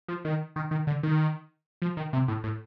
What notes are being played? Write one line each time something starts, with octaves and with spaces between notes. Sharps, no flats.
F3
D#3
D#3
D#3
D3
D#3
F3
D#3
C3
A2
A2